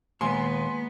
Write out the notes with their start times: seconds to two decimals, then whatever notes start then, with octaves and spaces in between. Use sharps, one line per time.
0.21 D#2 A#2 G#3 A#3 B3 G#5 C6